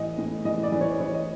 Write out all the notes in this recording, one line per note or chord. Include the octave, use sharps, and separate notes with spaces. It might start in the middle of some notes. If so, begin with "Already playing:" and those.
Already playing: A2 E3 D#5
A2
E3 D#5
D5
E3
C#5
E3 C#5
D#5